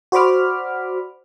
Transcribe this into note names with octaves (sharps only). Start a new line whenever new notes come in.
F#4 C5 D5 B5 D6 F6